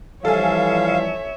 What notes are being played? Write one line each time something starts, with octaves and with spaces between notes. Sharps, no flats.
E3 F3 G3 A4 C#5 E5 F5 G#5